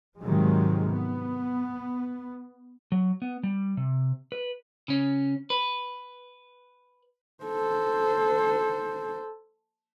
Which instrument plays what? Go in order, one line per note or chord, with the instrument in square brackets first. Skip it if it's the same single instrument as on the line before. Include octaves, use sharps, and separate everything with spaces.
[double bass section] G#2 C3 D#3 F3 F#3 G#3
B3
[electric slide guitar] F#3
B3
G3
C3
B4
[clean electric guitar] C#3 C#4
B4
[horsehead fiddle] A4 C5